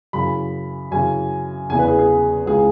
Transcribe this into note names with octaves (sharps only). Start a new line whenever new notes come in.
F#2 C#3 E3 B5
F#2 C#3 E3 G#5
E2 C#3 E3 G#5
B4
G#4
G#4
C#2 C#3 E3 G#4